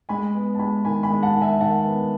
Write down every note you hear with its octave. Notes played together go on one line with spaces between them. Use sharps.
G#3 G#5 B5
B3
A5
G#3 G#5 B5
D#3 G#5 B5
G#5 B5
G#3
F#5 A5
D#3
E5 G#5
D#3 F#5 A5
B3